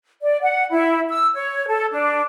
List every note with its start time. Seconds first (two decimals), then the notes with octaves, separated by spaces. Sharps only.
0.22 D5
0.42 F#5
0.71 E4
1.09 E6
1.34 C#5
1.68 A4
1.92 D4